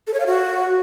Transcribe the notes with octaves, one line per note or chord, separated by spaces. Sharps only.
A4
C#5
F5
F#4